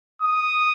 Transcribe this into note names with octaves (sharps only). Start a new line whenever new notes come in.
D#6